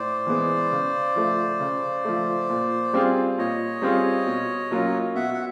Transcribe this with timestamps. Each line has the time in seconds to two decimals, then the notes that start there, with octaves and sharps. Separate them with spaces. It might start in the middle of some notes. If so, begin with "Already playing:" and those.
Already playing: A2 C5 D5
0.27 E3 G#3 B3
0.72 C#3
1.16 F3 A3
1.60 C#3
2.05 F3 A3
2.49 A#2
2.93 G3 C4 F4 G#4
3.38 A#2 C#5 D#5
3.82 G3 C4 F4 G#4
4.27 B2
4.71 F#3 A#3 C#4 F4
5.15 B2 E5 F#5
5.34 F#5